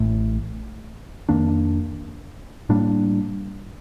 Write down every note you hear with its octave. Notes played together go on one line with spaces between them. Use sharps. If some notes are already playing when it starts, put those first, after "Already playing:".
Already playing: A1 A2 A3
F2 D#3 A#3 D4
A2 G3 A#3 D4